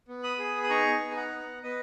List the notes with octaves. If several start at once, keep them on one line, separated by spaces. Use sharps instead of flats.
B3
B5 D#6
G#4
D#6
D#4 A#5 C#6
B3
G#5
F#5 A#5
B3
B3 B4 D#5